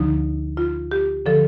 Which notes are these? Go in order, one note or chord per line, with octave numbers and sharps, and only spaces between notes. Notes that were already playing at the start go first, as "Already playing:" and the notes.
Already playing: D2 D3 F3 D#4
F4
G4
D3 F3 A4